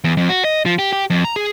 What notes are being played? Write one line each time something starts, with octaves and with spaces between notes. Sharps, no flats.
E2
F2
F#4
D#5
F3
G4
G4
F2
A#5
G#4